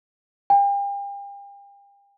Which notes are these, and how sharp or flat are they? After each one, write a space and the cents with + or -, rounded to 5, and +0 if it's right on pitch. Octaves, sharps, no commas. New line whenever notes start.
G5 +40